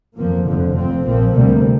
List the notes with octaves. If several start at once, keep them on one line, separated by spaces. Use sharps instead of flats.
F2 F3 A#3
F1 F2 D3 F3
F1 F2 F3 C4
A#1 A#2 F3 C4
D2 C3 G3 A#3